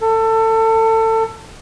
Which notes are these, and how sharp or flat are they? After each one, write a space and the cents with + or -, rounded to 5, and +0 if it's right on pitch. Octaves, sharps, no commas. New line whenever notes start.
A4 +25